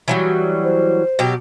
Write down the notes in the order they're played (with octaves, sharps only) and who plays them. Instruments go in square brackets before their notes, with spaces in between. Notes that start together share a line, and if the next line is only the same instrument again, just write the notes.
[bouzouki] E3 F#3 G3
[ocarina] C5
[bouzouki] B2 F#3 G4